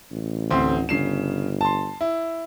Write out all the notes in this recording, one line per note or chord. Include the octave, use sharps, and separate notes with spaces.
A1
D2 C4 C6
G1 C#3 C7 E7
A5 C6
E4